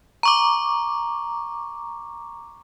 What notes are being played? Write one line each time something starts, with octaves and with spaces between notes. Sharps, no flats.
A#5 C#6 D6